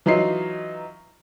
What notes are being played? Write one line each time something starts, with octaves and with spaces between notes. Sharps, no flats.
E3 F#3 D#4 F4 C7